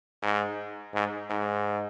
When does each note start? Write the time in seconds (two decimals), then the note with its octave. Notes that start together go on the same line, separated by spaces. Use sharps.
0.23 G#2
0.94 G#2
1.30 G#2